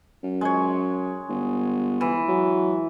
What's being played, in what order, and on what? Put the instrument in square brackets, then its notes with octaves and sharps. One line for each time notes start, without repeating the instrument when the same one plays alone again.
[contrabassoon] F#2
[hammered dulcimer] G#3 C#5
[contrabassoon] G1
[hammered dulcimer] E3
[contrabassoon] F#3